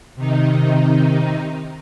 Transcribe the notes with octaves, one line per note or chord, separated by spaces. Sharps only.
C3 D#3 D#4